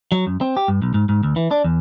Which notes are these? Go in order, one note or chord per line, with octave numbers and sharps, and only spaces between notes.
F#3
F#2
C4
G4
G2
B1
G#2
G#2
D2
E3
D4
E2